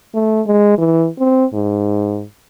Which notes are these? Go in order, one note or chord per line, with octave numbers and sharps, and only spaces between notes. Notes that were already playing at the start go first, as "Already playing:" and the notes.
A3
G#3
E3
C4
G#2